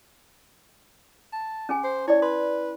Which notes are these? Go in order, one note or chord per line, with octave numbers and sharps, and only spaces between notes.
A5
C#4 G#4 G#5
C5
E4 C#5 D5
B4 C6